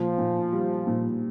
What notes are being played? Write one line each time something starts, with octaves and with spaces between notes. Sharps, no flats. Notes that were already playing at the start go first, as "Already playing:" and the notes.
Already playing: A#2 F3
A#2
G3
A#2